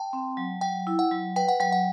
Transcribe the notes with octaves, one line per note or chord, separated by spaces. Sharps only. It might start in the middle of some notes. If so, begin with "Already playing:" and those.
Already playing: G5 A5
C4
F#3
F#3 G5
E4
F#5
F#3
B4 G5
F#5
F#3 G5
F#5